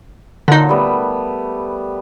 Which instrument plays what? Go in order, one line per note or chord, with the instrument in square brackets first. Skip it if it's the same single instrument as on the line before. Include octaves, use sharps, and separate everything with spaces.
[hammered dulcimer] A#2 F#3 F#4 [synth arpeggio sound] D3 D#4
[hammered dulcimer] G3 A3 B3